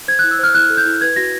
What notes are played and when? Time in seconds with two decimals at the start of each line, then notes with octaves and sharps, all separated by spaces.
0.08 C5 G#6
0.19 E4 F#6
0.31 E6
0.39 C5 F6
0.55 E4 F#6
0.70 A4
0.77 G6
0.85 E4
1.01 B4 G#6
1.16 F#4 A#6